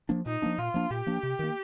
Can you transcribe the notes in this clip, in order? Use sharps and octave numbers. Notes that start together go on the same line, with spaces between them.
F3 A#3 D4
A#2 D#4
F3 A#3 D4
A#2 F4
F3 A#3 D4
A#2 G4
F3 A#3 D4
C3
D#3 A#3